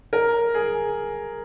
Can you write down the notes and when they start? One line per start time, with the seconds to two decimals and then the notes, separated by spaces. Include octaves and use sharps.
0.13 A#4
0.54 G#4